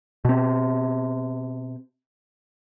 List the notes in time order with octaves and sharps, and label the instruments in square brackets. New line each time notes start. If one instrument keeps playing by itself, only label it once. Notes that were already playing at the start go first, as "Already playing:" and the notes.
[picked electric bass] B2 C4